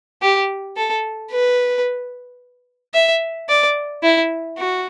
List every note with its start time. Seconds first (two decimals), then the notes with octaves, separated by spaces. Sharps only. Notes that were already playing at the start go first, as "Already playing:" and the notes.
0.22 G4
0.76 A4
1.31 B4
2.94 E5
3.49 D5
4.03 E4
4.58 F#4